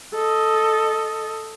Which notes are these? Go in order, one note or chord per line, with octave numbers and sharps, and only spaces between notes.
A4 D#5